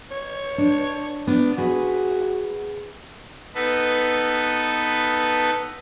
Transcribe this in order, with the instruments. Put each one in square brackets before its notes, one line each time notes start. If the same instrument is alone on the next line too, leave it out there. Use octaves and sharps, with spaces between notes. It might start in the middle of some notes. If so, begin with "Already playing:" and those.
[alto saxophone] C#5
[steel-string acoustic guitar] D4
[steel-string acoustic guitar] B3 [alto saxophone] D4
[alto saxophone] F#4 [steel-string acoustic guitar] G#4 B4
[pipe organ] B3 D#4 A4 B4